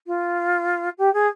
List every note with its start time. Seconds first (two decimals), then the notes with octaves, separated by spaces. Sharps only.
0.07 F4
0.98 G4
1.13 G#4